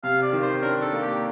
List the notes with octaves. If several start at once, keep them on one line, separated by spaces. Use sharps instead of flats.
C3 F5
D5
D#3
C5
D4 A#4
A4
A#3
G4